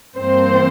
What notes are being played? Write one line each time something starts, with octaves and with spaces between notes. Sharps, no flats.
G2 E3 A#3 C4 C5